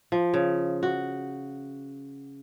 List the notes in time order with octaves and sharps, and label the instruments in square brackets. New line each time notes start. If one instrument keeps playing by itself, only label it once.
[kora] F3
C#3
F#4